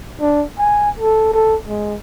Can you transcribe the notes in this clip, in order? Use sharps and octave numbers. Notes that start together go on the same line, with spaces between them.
D4
G#5
A4
A4
G#3